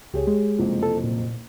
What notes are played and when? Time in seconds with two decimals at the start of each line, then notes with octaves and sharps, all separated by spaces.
0.14 C#2 G4 G#4 C#5
0.27 G#3
0.59 F#1 C2 F2
0.83 A4
1.04 A#2